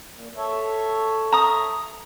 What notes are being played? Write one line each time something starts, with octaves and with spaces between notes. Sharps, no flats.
A#2
A4 C#5 E5
A#5 D#6